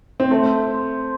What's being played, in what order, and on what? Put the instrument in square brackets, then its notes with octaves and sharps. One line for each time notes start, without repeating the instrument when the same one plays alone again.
[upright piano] C4
[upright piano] A3 [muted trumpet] C5